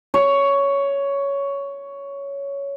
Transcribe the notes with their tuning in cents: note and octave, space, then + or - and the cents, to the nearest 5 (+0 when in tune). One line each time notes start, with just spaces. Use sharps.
C#5 +10